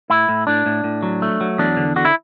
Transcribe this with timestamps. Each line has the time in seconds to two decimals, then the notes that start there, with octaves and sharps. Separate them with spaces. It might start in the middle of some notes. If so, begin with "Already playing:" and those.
0.10 A2 E4
0.29 A2
0.47 A2 D4
0.66 A2
0.84 A2
1.03 F#3
1.22 A3
1.41 F#3
1.58 E2 D4
1.77 D3
1.96 D3 F#4
2.05 E4